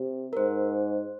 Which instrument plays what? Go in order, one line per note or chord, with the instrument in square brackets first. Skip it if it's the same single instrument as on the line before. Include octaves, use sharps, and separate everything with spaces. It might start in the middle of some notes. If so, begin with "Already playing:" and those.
Already playing: [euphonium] C3
[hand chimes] A#4
[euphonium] G#2 [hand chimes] C5